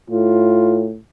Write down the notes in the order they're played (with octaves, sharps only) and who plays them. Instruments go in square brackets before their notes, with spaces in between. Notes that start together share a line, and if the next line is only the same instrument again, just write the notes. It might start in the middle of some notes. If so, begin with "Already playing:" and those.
[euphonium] A2 [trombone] F4